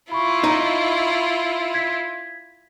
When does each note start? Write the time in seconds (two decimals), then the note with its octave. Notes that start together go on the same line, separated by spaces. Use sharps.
0.12 E4 F4 B5 C#6
0.44 D#4
1.74 G#6 B6